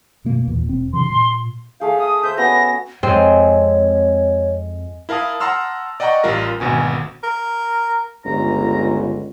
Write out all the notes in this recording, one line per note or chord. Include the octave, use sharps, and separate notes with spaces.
F#2 B2 A#3
D#2 A#2 E3
E1 C4
G2 C3 E3 C6
A#2
A3 G#4 F5 G5
F5 D#6
C5 E5 G6
B3 C#4 F#4 A#6
F2 G#3 C4 C#5
E4 A#4 F5 A5 D#6
F#5 A5 A#5 C6 E6 F6
D5 D#5 F#5 G5 A#5 C#6
A1 G3 F4 A#4 A#6
G#1 D2 B2 G#5
A#4
G1 C#2 A#5